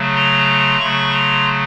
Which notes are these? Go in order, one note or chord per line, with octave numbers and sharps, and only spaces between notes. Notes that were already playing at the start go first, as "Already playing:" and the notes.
Already playing: C#3 F#3 A3
A#5 C6
C#3 F#3 A3 B5 C#6
A#5 C6